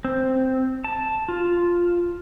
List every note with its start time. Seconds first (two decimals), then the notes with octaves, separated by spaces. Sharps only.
0.05 C4
0.84 A5
1.28 F4